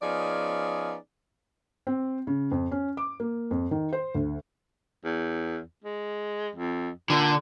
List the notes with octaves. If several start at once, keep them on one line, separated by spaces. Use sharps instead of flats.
F3 B3 C#4 D#4 G#4 D5
C4
C#3
F2
C#4
D6
A#3
F2
D#3
C5
D2
E2
G#3
F2
A#2 D3